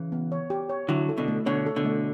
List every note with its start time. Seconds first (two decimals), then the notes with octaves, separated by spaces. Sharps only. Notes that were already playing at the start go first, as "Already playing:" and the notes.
Already playing: C#3 E3
0.12 B3
0.32 C#5
0.50 G4
0.69 C#5
0.88 D3 F#3 E4
1.09 A4
1.18 B2 D3
1.28 A3
1.46 B2 D3 C#5
1.66 A4
1.76 B2 D3
1.85 A3